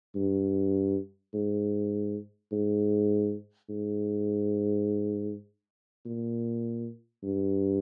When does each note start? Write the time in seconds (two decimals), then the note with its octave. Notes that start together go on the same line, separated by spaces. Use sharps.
0.15 G2
1.34 G#2
2.52 G#2
3.69 G#2
6.05 A#2
7.23 G2